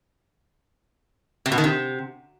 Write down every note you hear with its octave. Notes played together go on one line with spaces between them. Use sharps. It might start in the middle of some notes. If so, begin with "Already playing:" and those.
C3
B2
D#3
C3